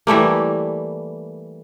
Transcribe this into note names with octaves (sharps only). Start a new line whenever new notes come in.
E3 G3 A3 A#3